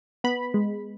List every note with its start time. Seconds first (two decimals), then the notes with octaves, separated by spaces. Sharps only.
0.24 B3 B5
0.54 G#3